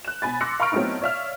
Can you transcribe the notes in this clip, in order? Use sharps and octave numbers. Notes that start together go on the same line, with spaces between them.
F#6 E7
B2 G#5 B5 A6
C6 D6 E6 F#6 A#6 C#7
F5 A#5 B5 C#6 F6 D7
F#3 A3 B3 C4 D#4 E4
C#5 D5 E5 F5 F6